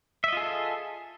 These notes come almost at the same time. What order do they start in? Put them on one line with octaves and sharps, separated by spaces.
E5 D#5 F4 G#4 A4